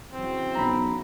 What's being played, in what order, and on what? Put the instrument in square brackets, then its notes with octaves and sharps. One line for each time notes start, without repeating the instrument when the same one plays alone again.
[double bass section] C#3 E3 F#3 [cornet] C4
[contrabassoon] B1 [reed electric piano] A#5 B5